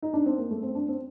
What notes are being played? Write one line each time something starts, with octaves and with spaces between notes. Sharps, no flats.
D#4
D4
C4
A#3
A3
C4
D4
C4